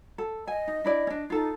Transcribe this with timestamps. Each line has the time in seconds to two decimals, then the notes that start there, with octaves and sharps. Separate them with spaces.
0.18 A4
0.47 D#5 G#5
0.68 D#4
0.85 D4 E4 D5
1.07 C#4 D4
1.30 D#4 F4 A4